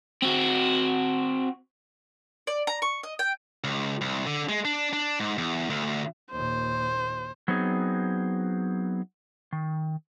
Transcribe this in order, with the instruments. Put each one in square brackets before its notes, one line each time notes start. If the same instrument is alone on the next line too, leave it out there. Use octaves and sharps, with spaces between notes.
[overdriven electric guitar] C4 F#4
[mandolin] D5
A#5
C#6
D#5
G5
[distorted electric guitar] C#2
C2
D3
G#3
D4
D4
G#2
E2
D2
[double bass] D#2 A#2 [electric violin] C5
[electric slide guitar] F#3 B3 C4 D#4 G#4
D#3